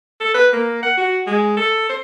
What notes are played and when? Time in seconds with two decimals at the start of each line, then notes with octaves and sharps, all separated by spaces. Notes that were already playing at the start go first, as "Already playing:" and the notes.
0.20 A4
0.34 B4
0.53 A#3
0.83 F#5
0.97 F#4
1.27 G#3
1.57 A4
1.89 C5